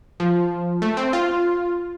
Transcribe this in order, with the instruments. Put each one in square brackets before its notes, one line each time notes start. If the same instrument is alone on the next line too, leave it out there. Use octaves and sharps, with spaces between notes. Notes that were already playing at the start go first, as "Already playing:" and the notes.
[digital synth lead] F3
A3
C4
F4